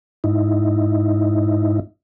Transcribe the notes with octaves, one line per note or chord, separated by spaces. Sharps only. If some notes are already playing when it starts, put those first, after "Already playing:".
G#2 D#4 E4